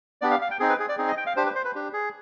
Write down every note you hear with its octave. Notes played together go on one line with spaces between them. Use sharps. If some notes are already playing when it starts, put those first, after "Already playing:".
B3 D4 G4 D5
F5
F5
G5
C4 D#4 G#4
B4
G#4
D5
C4 D#4 G#4
D#5
G5
F5
D4 G4 C5
B4
C5
B4
D4 G4
G#4